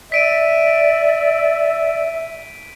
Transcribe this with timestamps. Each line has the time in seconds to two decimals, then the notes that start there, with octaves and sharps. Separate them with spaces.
0.12 D5 E5 B6 D7 D#7